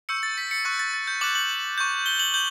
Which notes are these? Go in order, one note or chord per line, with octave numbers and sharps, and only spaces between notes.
C#6 E6 G6 C#7
A6
B6
C#7
C#6 F#6 A6
A6
A6
G6
D6 F#6 F#7
F#7
F#7
C#6 G6
G7
F#7
G6 F#7